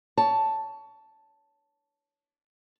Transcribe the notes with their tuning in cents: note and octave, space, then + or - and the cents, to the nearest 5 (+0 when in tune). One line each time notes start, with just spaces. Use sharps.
C#5 +20 A5 +0